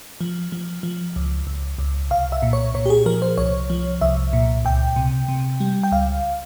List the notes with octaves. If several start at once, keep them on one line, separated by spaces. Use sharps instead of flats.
F3
F3
F3
C#2
C#2
C#2
C2 F5
E5
A#2
C#5
A#2 C#5
G4
G#4
F3 A#4
C5
C2 C#5
F3
C2 E5
A#2
C#2 G5
C3
C3
G3
G5
C#2 F5